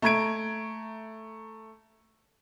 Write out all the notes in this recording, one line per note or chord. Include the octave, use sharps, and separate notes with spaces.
A3 A#5 G#6 D7